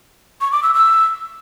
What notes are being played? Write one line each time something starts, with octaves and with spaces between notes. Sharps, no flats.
C#6
D6
E6
E6